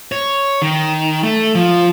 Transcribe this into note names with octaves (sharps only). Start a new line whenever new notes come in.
C#5
D#3
A3
F3